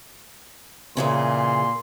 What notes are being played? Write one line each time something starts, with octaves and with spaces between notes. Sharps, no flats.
A#2 C#3 E3 G#4 C6